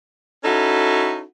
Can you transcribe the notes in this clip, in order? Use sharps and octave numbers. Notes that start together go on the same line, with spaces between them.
C#4 D#4 E4 F#4 A4